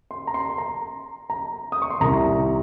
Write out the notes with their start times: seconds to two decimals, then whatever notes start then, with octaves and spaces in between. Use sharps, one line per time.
0.11 C6
0.27 A#5
0.34 C6
0.58 A#5
1.30 A#5
1.72 D#6
1.82 C#6
1.90 C6
2.00 C2 C3 D#3 A#5